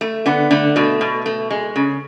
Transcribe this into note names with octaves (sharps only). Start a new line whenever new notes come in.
A3
D3 B3
D3 A3
B2 A3
B2
A3
G#3
C#3